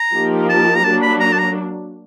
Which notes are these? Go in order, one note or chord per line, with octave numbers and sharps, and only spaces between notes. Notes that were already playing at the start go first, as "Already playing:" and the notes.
Already playing: A#5
F3 A#3 D#4 G4 A#4
A5
A#5
F#3 A#3 D4 A5
B5
A#5
A5
A#5